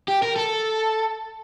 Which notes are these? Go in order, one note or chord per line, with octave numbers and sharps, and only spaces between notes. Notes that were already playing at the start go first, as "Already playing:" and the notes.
G4
A#4
A4